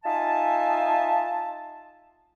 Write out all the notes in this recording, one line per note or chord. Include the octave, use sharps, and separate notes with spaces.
D#4 F4 E5 G#5 A5